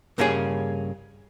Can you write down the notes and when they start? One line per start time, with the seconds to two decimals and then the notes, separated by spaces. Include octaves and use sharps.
0.18 G2 C#3 A#3 C#4 E4 G#4